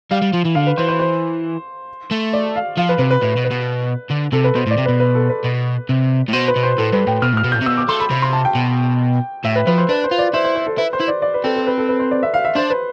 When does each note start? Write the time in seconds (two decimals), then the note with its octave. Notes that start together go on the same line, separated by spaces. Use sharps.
0.11 G3 F5
0.22 G3
0.33 F3
0.45 E3
0.55 D3 F5
0.67 B4
0.77 E3 C5
0.88 C5
0.99 C5
2.11 A3
2.33 D5
2.56 F5
2.78 F3 F5
2.89 B4
2.99 C3 B4
3.11 B4
3.22 A2 B4
3.37 B2
3.45 B4
3.51 B2
4.11 D3
4.33 C3 A4
4.44 B4
4.55 B2 C5
4.67 A2
4.71 D5
4.78 C3
4.85 B2 B4
5.00 B4
5.15 A4
5.30 B4
5.44 B2
5.89 C3
6.28 A2
6.33 B2 C5
6.48 B4
6.56 B2
6.63 C5
6.78 A2 A4
6.92 G2 B4
7.07 A2 G5
7.22 B2 F6
7.33 A2
7.37 F6
7.44 B2
7.52 A2 G6
7.61 C3
7.66 B2 E6
7.77 D6
7.89 A3 C6
8.00 B5
8.11 C3 B5
8.22 C6
8.33 A5
8.45 G5
8.55 B2
9.45 A2 E5
9.56 B4
9.67 F3 B4
9.78 C5
9.89 D4 B4
10.04 C5
10.11 F4
10.19 D5
10.33 E4 C5
10.44 C5
10.56 C5
10.67 A4
10.78 E4 B4
10.93 C5
11.00 E4
11.08 D5
11.22 D5
11.34 B4
11.44 C4 A4
11.56 A4
11.67 B4
11.78 A4
11.89 B4
12.00 C5
12.11 D5
12.23 E5
12.34 F5
12.45 E5
12.56 D4 C5
12.70 B4